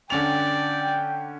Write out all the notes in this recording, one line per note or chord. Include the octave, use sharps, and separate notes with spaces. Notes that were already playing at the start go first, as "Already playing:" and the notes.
D3 C#4 D5 G5 F7